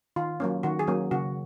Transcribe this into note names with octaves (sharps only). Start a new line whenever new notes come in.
D#3 F4
F#3 A#3 C#4
D#3 F#4
G#4
F#3 A#3 C#4
C#3 F#4